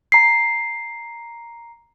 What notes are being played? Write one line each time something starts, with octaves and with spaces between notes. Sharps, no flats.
A#5 C7